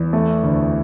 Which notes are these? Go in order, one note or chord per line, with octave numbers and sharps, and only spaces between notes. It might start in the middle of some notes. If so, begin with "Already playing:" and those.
Already playing: E2
A3
D2